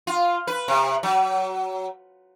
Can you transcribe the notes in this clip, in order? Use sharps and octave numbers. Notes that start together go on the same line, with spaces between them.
F4
B4
C3
F#3